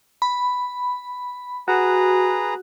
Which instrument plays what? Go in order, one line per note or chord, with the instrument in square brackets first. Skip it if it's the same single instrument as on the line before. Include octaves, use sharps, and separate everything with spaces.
[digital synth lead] B5
[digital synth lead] F#4 [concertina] G#4 B4 A#5